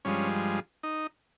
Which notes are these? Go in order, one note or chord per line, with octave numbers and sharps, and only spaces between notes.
G2 F3 G#3 C#4
D#4